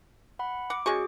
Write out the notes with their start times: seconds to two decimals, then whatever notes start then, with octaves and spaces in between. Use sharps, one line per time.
0.39 F#5 B5
0.70 F#5 D6
0.86 G#3 C#4 F#4 G#4 C#6